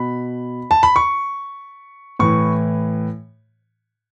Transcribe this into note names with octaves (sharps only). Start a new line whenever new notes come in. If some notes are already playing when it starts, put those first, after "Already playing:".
Already playing: B2 B5
A5
B5
C#6
A2 E3 C#6